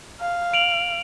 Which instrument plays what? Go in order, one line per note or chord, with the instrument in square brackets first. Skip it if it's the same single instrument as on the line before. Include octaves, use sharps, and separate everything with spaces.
[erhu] F5
[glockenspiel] D7 F7 F#7